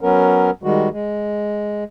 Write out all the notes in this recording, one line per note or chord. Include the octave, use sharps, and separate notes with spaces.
F#3 B3 C#4 A#4
D#3 G3 G#3 F#4
G#3